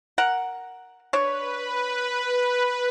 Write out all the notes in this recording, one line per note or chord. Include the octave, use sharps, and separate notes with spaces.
A#4 F#5
D4 B4 C#5